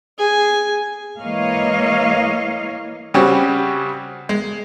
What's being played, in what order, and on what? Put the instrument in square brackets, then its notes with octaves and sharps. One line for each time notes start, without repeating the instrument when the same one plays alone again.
[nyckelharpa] G#4 G#5
[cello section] E3 G#3 A#3 C#5 D#5 F5
[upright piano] C#3 G3 C4 C#4 F#4 G4
G#3